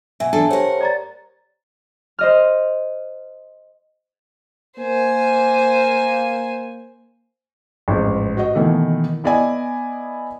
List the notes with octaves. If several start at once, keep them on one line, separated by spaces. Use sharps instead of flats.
B2 E5 G#5
E2 D4 A4 A5
G4 A#4 C5 C#5 F#5
D5 A#5 A6
C5 D#5 F6
A#3 C5 G#5
A1 F2 G#2
F#4 D#5
B2 D#3 E3 A3 A#3
B3 E4 D5 D#5 G#5